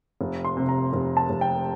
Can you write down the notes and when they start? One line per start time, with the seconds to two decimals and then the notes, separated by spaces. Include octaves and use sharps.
0.21 F1
0.45 C6
0.57 C3
0.69 A#5
0.93 F1
1.17 A5
1.30 F1
1.41 G5